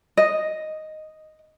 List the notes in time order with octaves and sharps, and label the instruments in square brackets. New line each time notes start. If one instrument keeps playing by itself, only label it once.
[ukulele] D#5